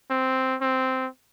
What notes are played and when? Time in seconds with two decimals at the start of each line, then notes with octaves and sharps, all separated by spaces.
0.10 C4
0.61 C4